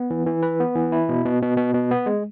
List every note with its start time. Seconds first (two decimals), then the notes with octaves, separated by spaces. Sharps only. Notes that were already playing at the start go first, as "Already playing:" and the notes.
Already playing: B3
0.10 E3
0.26 E3
0.43 B4
0.60 B3
0.76 E3
0.92 E4
1.09 B2
1.25 B2
1.42 B2
1.57 B2
1.74 B2
1.91 B3
2.06 G#3